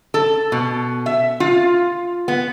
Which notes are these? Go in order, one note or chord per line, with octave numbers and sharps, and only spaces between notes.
A4
B2
E5
F4
B3